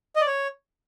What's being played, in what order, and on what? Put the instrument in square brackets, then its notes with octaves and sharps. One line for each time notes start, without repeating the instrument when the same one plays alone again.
[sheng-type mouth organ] D#5
D5
C#5